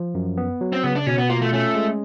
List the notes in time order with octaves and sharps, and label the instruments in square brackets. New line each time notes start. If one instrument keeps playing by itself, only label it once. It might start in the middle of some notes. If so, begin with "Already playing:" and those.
Already playing: [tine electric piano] F3
F#2
B3
F#3
[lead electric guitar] C4
[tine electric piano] C#3 [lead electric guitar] B3
[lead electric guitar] D4
[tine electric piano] B2 [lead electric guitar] C#4
[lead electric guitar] B3
[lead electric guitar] A#3 [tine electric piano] F4
[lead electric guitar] A3
[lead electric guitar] A3 [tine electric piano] C#4
[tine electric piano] G#3